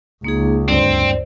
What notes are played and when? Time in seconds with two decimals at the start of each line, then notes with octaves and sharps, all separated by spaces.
0.24 C#2 A#3 D#4 G#4
0.68 D2 G2 C4 D4 C5 D5